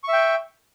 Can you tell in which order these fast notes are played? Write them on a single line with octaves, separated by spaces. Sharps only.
C#6 E5 G5